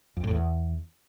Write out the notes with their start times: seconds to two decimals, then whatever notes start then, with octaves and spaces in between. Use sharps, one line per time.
0.17 F2
0.24 A2
0.31 E2